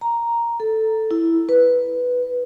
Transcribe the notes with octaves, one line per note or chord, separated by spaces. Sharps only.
A#5
A4
E4
B4